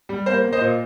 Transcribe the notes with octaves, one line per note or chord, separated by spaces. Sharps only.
G3
A#3 C5
A#3
C5 D#5
A#2